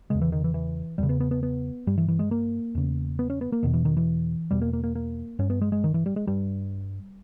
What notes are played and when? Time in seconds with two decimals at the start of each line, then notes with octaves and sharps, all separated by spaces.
0.10 E2 C#3 G#3
0.22 E3
0.32 D#3
0.44 E3
0.54 E3
0.98 E2 C#3 G3
1.09 B3
1.20 B3
1.31 B3
1.43 B3
1.87 G2 G3
1.98 E3
2.08 E3
2.19 G#3
2.31 A#3
2.75 E2 C#3
3.19 B3
3.30 C#4
3.41 B3
3.52 A#3
3.63 E2 B2 D#3
3.73 E3
3.85 D#3
3.97 E3
4.51 E2 B2 G3
4.62 A#3
4.73 A#3
4.84 A#3
4.95 A#3
5.39 G2 C#4
5.50 B3
5.61 G#3
5.72 G#3
5.84 D#3
5.94 E3
6.06 G3
6.16 G#3
6.27 G2 G3